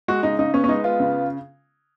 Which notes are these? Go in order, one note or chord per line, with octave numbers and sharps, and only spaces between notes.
G#3 F#4
C#3 D#4
C#3 D#4
B3 C#4
C#4
G#3 D#4
B3 F4
C#3